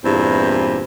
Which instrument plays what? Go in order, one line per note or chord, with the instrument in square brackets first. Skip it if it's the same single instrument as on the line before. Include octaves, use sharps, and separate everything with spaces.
[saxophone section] E2 G2 A#2 C4 E4